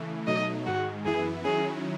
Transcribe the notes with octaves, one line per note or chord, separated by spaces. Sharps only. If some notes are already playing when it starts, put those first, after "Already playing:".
Already playing: C#3 E3 A3
B2 F#3 A3 D#4 D#5
G#2 D#3 G#3 F#4
F#2 E3 B3 E4 G#4
D#3 F#3 C#4 E4 G#4